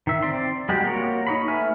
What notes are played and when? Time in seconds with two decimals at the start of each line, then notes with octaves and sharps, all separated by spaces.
0.07 D#3 E5
0.23 C4 D5 C6
0.69 G3 G#3 F#4 G4
0.84 A#3 F4 F#4 A#4 C#5
1.27 D#4 C#5 B5
1.48 A3 B4 E5 G#5 F6